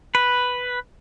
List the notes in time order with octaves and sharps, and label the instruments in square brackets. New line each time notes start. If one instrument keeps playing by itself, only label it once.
[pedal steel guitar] B4